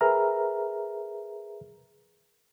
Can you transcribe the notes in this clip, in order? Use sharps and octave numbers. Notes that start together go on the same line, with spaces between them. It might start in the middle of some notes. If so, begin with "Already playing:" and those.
G#4 A#4 B4 E5 A#5 F6